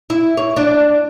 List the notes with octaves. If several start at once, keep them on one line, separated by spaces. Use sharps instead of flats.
E4
C#5
D4